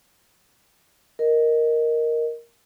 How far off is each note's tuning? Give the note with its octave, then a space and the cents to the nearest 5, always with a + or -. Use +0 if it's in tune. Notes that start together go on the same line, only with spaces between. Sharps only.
A#4 +0 D#5 +0